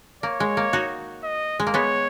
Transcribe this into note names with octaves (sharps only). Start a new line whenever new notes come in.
A#3 C#5
G#3
A#3
D#4 F#4
D#5
G#3
A#3
G#3 B3 C#5